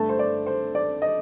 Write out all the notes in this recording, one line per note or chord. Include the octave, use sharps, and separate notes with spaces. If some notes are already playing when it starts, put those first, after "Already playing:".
Already playing: G2 D3 A3 A5
C5
D5
C5
D5
D#5